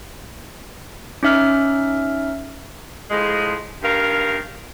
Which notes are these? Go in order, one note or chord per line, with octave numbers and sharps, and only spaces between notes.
C#4 D#4 E5 F6
A2 F3 G#3
G2 D#3 A#4 F5